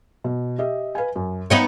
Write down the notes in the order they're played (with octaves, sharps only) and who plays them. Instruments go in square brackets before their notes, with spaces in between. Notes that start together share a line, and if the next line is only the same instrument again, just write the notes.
[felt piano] B2
G4 D#5 E5
B4 F5 G#5
F#2
[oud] B3 D#4 C#5 [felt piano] D#5 F5 G5